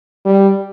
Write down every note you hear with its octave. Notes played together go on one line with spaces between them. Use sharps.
G3